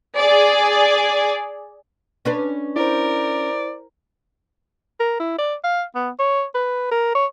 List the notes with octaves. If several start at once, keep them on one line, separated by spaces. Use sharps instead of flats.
G#4 D5
C#4 D4 B4
E4 A#4 C5 D5
A#4
E4
D5
F5
B3
C#5
B4
A#4
C#5